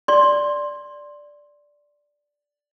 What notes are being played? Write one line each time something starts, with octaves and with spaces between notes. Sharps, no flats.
D5 C6